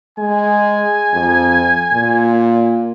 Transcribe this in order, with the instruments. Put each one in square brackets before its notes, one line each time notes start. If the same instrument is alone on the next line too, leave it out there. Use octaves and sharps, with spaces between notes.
[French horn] G#3 [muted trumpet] G#5
[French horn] F2
A#2